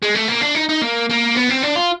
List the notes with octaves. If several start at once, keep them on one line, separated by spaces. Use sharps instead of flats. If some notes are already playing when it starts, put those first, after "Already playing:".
G#3
A3
A#3
D4
D#4
D#4
A#3
A#3
B3
C4
D4
F4